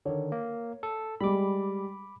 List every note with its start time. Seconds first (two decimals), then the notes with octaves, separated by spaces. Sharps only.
0.06 D3 D#3 C#5
0.32 A#3
0.83 A4
1.21 G3 G#3 B5 D6